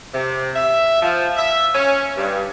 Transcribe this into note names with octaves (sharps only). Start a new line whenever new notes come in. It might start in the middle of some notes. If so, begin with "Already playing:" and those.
C3
E5
F3
E5
C#4
G2